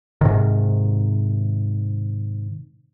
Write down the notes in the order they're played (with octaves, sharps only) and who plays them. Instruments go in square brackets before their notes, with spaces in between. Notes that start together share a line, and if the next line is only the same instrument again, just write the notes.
[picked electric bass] G#2 C3 D#3